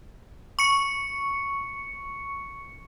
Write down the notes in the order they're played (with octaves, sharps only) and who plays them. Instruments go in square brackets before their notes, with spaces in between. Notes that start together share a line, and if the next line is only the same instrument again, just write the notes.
[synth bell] C#6 C#7